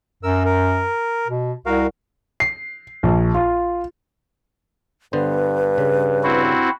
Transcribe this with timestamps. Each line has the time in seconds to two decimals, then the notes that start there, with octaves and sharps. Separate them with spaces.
0.23 F#2 A#4 E6
0.45 A#4
1.28 B2
1.66 C2 F#4 A#4 F5
2.40 C7
3.03 A#1
3.34 F4
5.13 G2 D3 B3 B4 C5
5.78 C#3
6.24 C4 E4 F#4